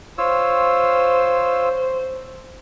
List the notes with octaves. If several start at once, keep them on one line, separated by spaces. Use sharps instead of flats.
F4 C5 C#5 E6